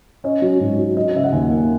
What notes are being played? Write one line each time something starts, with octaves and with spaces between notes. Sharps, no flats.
C#4 D#5
F#3
G#2
F#3
F#3 D#5
D#5
C#3 E5
F#5
D#2 G#5
A#3